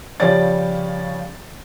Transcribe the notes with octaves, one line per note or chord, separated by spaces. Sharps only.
C#3 F3 G3 C#5 D5 A6